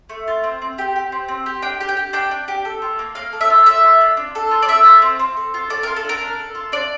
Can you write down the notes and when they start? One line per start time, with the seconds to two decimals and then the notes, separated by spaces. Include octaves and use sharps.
0.10 A3
0.28 F4
0.44 C4
0.62 C4
0.78 G4
0.96 G4
1.12 C4
1.28 C4
1.46 G4
1.62 D4 G5
1.81 G4
1.89 G5
1.97 G4
2.13 D4 G5
2.31 D4
2.48 G4
2.65 A4
2.82 F4
2.99 A#3
3.15 A#3 F5
3.33 A4
3.41 E5
3.50 F4
3.66 A4 E5
3.84 F4
4.01 D4
4.17 D4
4.35 A4
4.51 F4
4.62 D5
4.69 A4 E5
4.85 F4
5.02 C4
5.19 C4
5.37 A4
5.54 F4
5.70 A4 D5
5.83 A#4
5.87 F4
5.96 A4
6.05 D4 A#4
6.21 D4
6.39 A4
6.55 F4
6.72 D4 D5